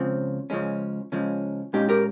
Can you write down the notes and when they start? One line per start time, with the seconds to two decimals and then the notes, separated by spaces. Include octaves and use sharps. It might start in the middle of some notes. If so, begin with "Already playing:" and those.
Already playing: C#2 C#3 F3 C4 C#4
0.50 C#2 C#3 F3 G#3 C#4
1.12 C#2 C#3 F3 G#3 C#4
1.73 A#2 G#3 C#4 D#4 G4
1.89 G4 A#4